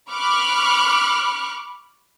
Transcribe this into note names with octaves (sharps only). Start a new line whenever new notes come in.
B5 C#6 D6 F6 F#6